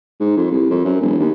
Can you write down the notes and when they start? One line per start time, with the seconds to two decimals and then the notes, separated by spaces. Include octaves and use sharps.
0.20 G#2
0.36 F2
0.51 C2
0.70 F2
0.85 F#2
1.01 E1
1.19 D#2